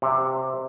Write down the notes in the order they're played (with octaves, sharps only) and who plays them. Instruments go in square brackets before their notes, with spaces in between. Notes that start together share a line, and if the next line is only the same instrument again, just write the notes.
[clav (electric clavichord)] C3